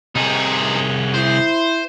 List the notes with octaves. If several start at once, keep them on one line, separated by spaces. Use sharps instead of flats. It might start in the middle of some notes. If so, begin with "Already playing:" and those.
C2 C3 D#4 G#4
E4 C5